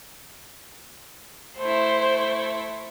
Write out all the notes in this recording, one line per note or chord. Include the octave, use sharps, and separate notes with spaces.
A3 E4 C5